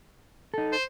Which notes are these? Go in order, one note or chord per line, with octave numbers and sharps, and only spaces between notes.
D#4 A4
C5